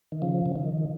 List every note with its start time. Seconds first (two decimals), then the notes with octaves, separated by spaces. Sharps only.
0.12 D#3
0.22 C#3 F3
0.46 C#3
0.56 D#3